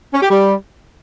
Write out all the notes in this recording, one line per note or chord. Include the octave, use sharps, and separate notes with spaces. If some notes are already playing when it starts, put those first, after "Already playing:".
C#4
G4
G3